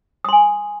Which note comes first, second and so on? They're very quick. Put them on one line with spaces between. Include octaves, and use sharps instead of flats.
D#6 C6 G#5